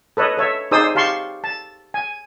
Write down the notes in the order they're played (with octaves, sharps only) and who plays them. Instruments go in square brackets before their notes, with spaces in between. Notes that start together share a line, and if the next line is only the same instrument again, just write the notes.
[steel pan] A4 B4 C#5 D#5
A4 C#5 E5
D#4 G#4 C5 D5 D#6 E6
G4 F5 A5 C6 C#6
A5
G#5